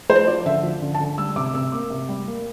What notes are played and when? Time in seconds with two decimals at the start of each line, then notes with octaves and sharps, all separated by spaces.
0.09 F3 C5
0.27 F3 D5
0.46 D3 E5
0.63 F3
0.82 D3
0.94 A5
1.00 D3
1.18 G3 E6
1.36 C3 D6
1.54 C3 E6
1.72 A#3 D6
1.90 C3
2.09 G3
2.27 A#3